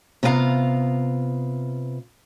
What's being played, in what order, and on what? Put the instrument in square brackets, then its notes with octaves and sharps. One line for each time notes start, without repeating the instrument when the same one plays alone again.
[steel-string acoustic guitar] C3 B3 F4 D#5 F5 A#5